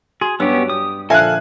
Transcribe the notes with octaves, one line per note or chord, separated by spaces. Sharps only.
F#4 G#4
G2 F#3 B3 C#4 G4 E6
G4 D#6
A#2 D3 F3 A4 E5 F5 G#5 F#6